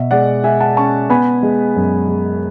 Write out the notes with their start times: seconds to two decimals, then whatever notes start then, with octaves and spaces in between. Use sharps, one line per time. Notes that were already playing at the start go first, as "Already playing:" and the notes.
Already playing: B2 E5
0.11 G#3 D5 F#5
0.44 G#3 E5 G#5
0.60 F#5 A5
0.77 C#4 A5 C#6
1.10 B3 G#5 B5
1.43 G#3
1.76 F#2
2.08 G#3